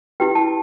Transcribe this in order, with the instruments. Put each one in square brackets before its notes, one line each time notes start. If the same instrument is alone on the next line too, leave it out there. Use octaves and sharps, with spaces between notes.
[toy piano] E4 G4 B4 G5
A5